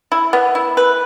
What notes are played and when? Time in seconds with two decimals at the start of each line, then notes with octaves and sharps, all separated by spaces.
0.12 E4
0.33 B3
0.55 E4
0.77 B4